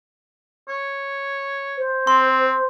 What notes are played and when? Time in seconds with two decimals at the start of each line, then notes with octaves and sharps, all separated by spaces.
0.69 C#5
1.78 C5
2.07 C4 C6